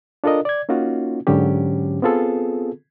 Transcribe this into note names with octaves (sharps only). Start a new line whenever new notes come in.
D4 F4 A4 A#4 D#5
D5 G#6
A#3 C#4 D#4 F4 F#4
G#2 D3 F#3 C#4 G4
B3 C4 F4 G#4 A4